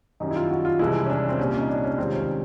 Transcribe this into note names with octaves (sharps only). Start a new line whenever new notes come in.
F#2 D#3 G3 D#4
E4
F4
F#4
F4
C2 C3 E3 G#3 E4
C#4
D4
C4
C2 A#2 G3 C#4
C#4
D#4
D4
C#4
C#2 C3 D#3 G3 C4
C#4